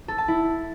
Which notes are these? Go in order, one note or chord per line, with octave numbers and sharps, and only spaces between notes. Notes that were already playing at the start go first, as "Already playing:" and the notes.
A4
A5
E4